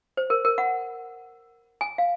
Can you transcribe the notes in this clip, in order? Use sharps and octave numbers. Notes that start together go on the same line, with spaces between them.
C5
A#4
A#4
F#5
G#5
F5